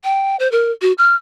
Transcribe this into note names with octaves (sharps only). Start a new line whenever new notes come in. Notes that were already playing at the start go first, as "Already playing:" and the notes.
G5
C5
A#4
F#4
F6